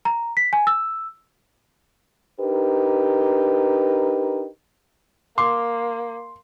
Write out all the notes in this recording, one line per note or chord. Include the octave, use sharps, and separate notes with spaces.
A#5
B6
G#5
E6
D4 D#4 G4 A#4 B4
A#3 C6 D6